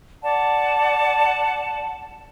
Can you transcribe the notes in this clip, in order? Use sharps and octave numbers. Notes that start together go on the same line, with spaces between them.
D5 F#5 A5